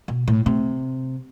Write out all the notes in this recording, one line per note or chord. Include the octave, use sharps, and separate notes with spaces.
B2
A2
C3